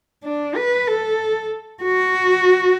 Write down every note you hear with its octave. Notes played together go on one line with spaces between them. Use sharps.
D4
B4
A4
F#4